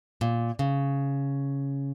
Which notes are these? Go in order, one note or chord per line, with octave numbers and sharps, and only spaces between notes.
A#2
C#3